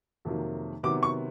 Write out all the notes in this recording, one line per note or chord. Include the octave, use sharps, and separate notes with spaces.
F2 C3 D#3 F#3 A#3
C3 D#3 F#3 B3 D6
C#6